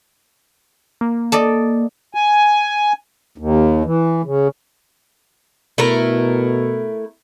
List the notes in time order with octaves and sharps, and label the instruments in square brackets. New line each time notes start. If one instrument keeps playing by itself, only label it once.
[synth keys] A#3
[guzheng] A4 D5 D#5
[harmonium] G#5
D#2
E3
C#3
[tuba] B2 [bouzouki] A3 E4 A#4